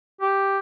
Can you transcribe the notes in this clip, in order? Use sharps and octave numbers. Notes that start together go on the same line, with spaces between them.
G4